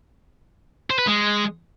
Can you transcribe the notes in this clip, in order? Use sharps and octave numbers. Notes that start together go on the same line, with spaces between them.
C5
B4
G#3